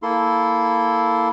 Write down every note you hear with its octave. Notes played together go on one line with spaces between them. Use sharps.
A#3 E4 A4 C6